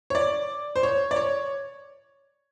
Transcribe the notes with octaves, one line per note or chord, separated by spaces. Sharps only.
C#5
D5
C5
C#5
D5
C#5